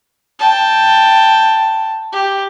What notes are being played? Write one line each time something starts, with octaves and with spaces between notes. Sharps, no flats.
G5 A5
G4